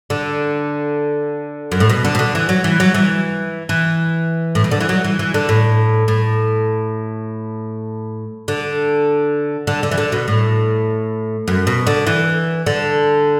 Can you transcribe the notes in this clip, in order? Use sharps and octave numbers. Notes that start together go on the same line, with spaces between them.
D3
F#2
A2
B2
D3
B2
D3
E3
F#3
E3
F#3
E3
E3
A2
B2
D3
E3
F#3
E3
E3
D3
A2
A2
D3
D3
D3
E3
D3
B2
A2
F#2
B2
D3
E3
D3